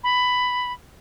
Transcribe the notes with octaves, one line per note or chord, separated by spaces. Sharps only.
B5